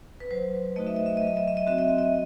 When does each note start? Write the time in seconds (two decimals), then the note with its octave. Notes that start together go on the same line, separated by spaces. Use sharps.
0.20 B4
0.31 F#3 C5
0.76 A3 D#4 F#4 D#5
0.87 E5
0.96 D#5
1.06 E5
1.17 F#3 D#5
1.27 E5
1.37 D#5
1.48 E5
1.57 D#5
1.67 C4 F#4 E5
1.78 D#5
1.88 E5
1.98 D#5